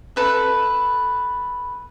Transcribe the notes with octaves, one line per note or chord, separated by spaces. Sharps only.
A4 B4 E5